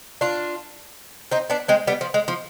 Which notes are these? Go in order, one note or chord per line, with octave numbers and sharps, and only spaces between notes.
D4 F4
C4 D#4
B3 D4
G#3 C4
G3 B3
F3
G#3
F3